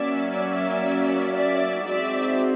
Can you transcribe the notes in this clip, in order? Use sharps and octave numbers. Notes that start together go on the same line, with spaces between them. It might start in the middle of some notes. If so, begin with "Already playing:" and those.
Already playing: F#3 A#3 C#4 D5 E5
D5 E5
D5 E5
G#3 C4 D#4 F#4 D5 E5